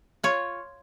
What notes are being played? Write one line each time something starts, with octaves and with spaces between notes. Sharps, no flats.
F4 C#5